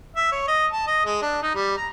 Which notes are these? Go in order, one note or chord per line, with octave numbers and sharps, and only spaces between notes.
E5
C#5
D#5
A5
D#5
G#3
D4
D#4
G3
A#5